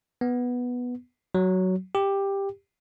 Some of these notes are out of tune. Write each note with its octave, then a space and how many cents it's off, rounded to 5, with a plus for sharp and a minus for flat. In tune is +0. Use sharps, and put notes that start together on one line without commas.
B3 -5
F#3 +10
G4 +10